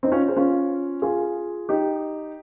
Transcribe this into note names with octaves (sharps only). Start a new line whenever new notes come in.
C4 D#4
C#4 F4
G#4 C5
C#4 F4
F4 G#4
D#4 G4